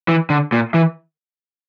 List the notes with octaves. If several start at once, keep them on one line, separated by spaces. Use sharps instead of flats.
E3
D3
A#2
E3